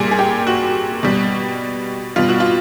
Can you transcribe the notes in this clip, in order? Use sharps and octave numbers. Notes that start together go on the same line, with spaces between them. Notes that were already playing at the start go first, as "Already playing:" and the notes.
Already playing: A#2 G3 G#4
G#4
G4
F#4
B2 G3
B2 G3 F4
F#4
F4